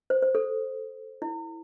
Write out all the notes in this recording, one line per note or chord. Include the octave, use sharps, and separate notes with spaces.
C5
C5
A4
E4